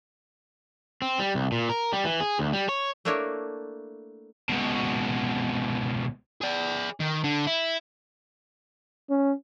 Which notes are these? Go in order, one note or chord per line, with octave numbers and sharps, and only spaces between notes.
C4
G3
C2
A#2
A#4
G3
E3
G#4
D2
G3
C#5
A3 A#3 D4 E4 A#4 C#5
C#2 B2
G#4 D5
D#3
D3
E4
C#4